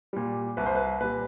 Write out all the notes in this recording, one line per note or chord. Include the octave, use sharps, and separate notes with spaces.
A#2 G3
C2 B4
C5
B4
A#2 G3 B4